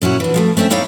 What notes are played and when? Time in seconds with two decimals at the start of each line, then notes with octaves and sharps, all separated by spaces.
0.02 A#2 C#4 E4 F#4
0.20 E3 D4
0.34 F3 G#3 A3
0.57 A3 C4 C#4 B4 E5
0.70 A#3 D#4 E4 C#5 D5 F5